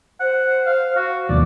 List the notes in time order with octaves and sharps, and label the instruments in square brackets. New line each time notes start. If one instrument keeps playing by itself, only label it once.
[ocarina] C5 [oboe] F#5
[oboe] F5
F#4
[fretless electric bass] D#2 B2 E3 [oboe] D5